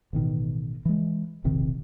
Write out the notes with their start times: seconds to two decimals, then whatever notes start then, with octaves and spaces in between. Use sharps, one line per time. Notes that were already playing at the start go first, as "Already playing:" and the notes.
0.13 A1 B2 D#3
0.85 E3 G#3
1.44 E1 A#1 C3 D#3